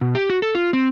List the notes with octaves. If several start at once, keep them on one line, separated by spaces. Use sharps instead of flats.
B2
G4
F#4
A4
F4
C4